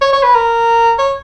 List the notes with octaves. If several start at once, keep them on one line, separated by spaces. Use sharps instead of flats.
C#5
C#5
B4
A#4
C#5